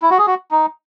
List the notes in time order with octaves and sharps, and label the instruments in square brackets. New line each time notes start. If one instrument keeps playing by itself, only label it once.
[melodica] E4
F#4
G#4
F#4
D#4